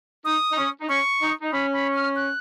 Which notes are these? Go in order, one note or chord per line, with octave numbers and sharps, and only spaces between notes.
D#4 D#6
D#4
C#4
D#4
C#4 C#6
D#4
D#4
C#4 B5
B5
F6
F#6